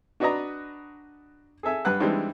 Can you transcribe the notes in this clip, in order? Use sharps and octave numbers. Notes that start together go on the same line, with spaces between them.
D4 F#4 B4 D5 D#5 A#5
G#4 A4 E5 G#5
G2 B4 F#5 F#6
E3 G3 G#3 C4 D4 D#4